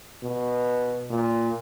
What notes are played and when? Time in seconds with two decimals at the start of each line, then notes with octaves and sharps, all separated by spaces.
0.23 B2
1.10 A#2